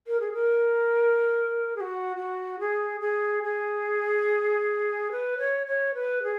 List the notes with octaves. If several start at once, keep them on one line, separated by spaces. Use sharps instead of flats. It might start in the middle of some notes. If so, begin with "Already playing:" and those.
A#4
G#4
A#4
G#4
F#4
F#4
G#4
G#4
G#4
B4
C#5
C#5
B4
G#4